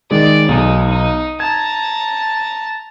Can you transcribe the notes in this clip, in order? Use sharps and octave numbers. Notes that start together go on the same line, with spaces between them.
D#3 G#3 G#4 D5
B1 G#3 D#4
D#4
A5 A#5 G#6